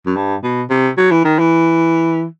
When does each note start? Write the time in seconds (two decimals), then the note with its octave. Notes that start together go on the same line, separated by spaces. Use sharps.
0.06 F#2
0.16 G2
0.44 B2
0.70 C3
0.97 F#3
1.11 E3
1.25 D#3
1.39 E3